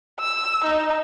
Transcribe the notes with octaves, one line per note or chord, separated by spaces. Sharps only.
E6
D#4